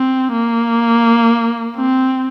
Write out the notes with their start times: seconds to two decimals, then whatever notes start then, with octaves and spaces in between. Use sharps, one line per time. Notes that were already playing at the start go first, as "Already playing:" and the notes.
Already playing: C4
0.33 A#3
1.77 C4